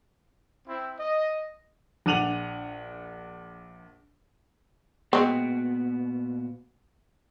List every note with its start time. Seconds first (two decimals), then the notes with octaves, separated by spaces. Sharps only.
0.67 C4 E4
0.98 D#5
2.06 A#1 D4 F#5 D#7 F7 F#7
5.13 A#2 G#3 B3 C4 F#4